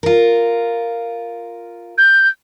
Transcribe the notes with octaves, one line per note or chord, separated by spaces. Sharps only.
F4 A#4
G6